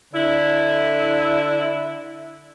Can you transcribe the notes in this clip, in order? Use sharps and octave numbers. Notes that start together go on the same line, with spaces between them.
D3 E4